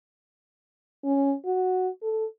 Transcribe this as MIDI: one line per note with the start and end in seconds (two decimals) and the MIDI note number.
1.04 1.34 61
1.46 1.89 66
2.02 2.25 69